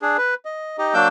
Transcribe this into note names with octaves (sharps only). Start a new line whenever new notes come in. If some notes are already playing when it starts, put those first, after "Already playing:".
D4 G#4
B4
D#5
D#4 G4 D#5
F#3 A#3 D4 D6 E6 G6